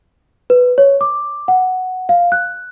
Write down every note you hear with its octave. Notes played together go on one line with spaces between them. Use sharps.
B4
C#5
D6
F#5
F5
F#6